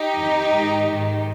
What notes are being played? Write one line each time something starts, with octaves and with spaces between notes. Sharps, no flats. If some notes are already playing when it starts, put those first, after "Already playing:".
Already playing: D#4 G4
F2 D#3
G#2 D#3
G#2 D#3